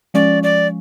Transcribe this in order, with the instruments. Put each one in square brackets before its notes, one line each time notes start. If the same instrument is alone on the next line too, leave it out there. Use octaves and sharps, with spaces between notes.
[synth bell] F3 G#3 C#4 [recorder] D5
[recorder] D5